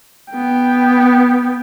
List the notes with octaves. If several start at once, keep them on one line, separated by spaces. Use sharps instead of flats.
B3 G5